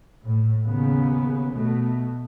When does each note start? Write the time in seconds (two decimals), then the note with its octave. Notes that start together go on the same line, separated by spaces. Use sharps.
0.24 A2
0.65 D#2 C#3 B3
1.52 B2 A3